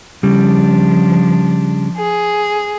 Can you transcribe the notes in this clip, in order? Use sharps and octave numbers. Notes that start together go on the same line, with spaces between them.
C#3 F3 G3 D4
G#4